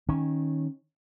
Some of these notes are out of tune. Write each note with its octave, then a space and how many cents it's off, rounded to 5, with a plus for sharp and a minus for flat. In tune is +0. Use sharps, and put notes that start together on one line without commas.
D#3 +0 C#4 -15